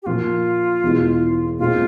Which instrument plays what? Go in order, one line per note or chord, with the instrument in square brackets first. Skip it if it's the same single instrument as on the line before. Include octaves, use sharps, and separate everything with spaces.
[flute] G4
[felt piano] A#2 F3 A#3 [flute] F4
[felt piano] E1 E2 E3 G#3
[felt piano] A#2 G#3 C4 [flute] F4